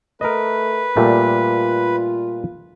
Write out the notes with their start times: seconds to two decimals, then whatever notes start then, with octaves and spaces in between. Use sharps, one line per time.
0.21 A3 A#4 B4 D#5
0.97 A#2 G3 A3 F4